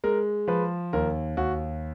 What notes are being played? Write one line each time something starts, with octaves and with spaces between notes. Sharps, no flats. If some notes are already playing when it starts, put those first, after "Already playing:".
G#3 A#4
F3 B4
D#2 A#4
D#2 F#4